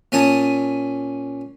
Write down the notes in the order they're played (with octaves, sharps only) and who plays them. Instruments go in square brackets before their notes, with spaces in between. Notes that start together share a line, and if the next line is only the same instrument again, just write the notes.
[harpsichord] A#2 C#4 G#5 A5 D#6